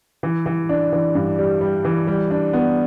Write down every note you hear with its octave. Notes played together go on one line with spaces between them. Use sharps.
E3
E3
D4
E3
G2
G3
G3
E3
G3
D4
B3